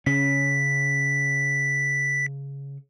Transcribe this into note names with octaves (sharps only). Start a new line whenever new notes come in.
C#3 C#4 B6